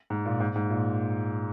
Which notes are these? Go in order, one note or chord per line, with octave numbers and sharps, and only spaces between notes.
G#2
A#2
G#2
G#2
A#2